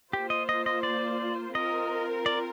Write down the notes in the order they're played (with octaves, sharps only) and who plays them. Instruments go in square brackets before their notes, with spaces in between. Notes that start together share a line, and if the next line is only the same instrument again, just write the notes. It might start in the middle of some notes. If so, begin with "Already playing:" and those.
[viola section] A#3 F4 C5 [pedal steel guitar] G4
[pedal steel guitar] D#5
D#5
D#5
D5
[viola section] C4 F4 A#4 [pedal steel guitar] D#5
[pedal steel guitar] D5